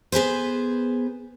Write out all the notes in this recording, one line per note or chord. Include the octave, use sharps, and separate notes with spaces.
B3 G#4 B4 C5